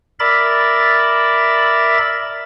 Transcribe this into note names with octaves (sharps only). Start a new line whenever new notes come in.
A#4 D5 E5 B5 A6